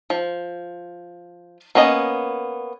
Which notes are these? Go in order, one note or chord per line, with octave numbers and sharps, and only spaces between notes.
F3
A#3 B3 C#4 D#5